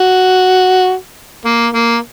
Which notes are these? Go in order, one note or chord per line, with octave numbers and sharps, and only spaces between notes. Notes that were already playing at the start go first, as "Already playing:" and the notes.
Already playing: F#4
A#3
A#3